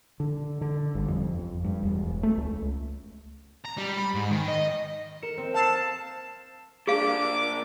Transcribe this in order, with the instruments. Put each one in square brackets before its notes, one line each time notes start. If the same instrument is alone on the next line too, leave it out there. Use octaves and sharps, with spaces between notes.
[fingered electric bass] D3
D3
G1
F2
F2
G2
E1
A3
C#2
[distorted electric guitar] A#5
G3
B5
G#2
D#3
D#5
[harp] A#4 C#7 E7
C4
[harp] F5 E6 C7 [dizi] A5
[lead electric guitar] A#2 D4 [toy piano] G#4 F5 [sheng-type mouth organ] D6